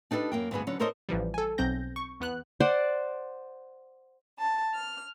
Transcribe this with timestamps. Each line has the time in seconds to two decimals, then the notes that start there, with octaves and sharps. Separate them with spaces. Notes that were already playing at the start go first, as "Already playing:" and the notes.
0.11 D4 D#4 G4 A4 B4
0.32 F#2 A#3 G5
0.51 D2 G2 B3 G#4
0.67 D3 F#3 C#4
0.79 D#4 A4 A#4 C5 C#5 D#5
1.09 A1 E3 F3 G3
1.34 A4 G#5
1.58 B1 C4 G6 A#6
1.96 C#6
2.20 E2 B3 F#6
2.60 C5 D5 F#5
4.38 A5
4.73 F6